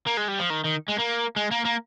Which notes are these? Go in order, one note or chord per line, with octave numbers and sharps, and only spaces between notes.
A#3
G#3
G3
F3
D#3
D#3
G#3
A#3
G#3
A#3
A#3